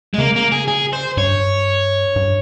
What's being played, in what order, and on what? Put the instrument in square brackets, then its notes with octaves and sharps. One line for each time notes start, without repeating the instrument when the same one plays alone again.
[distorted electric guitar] G#3
[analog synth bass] C#3 [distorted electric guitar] A#3
[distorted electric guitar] A#3
G#4
G#4
C5
[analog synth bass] G2 [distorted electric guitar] C#5
[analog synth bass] G2